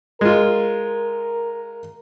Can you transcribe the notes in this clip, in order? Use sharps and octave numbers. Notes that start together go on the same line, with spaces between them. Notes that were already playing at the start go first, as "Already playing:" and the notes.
G#3 F4 A#4